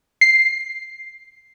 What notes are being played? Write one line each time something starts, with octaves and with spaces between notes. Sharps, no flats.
C7